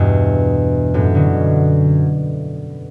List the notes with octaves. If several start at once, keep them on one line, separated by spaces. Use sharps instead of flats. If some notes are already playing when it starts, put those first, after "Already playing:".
Already playing: E2 G2 B2
F#2 A2
B2 D3